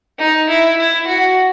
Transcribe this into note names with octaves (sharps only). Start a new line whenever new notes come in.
D#4
E4
E4
F#4